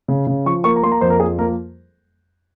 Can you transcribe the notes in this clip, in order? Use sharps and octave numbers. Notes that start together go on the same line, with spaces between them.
C#3
C#3
F3 C#6
A#3 C#6
A#5
A#3 C6
A#5
F2 C5
A#4
F3 G#4
A#3 A#4